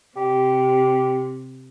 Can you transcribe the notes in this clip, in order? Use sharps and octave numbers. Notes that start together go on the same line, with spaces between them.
C3 G4